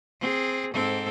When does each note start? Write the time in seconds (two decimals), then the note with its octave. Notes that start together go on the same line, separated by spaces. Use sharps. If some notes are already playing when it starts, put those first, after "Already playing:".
0.20 C4 G#4
0.74 G#2 C4 A4